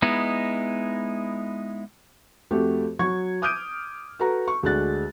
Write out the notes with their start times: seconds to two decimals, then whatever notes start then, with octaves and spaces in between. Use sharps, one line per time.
0.02 G#3 B3 D#4 E4
2.51 F2 A3 F#4 G4 A4
2.99 F#3 F#4 C#6 G#6
3.42 D6 D#6 F6 G6 D7 D#7
4.19 F#4 A4 B4 A#5
4.48 C#6
4.63 D2 G#3 D4 F#4 F#6 A6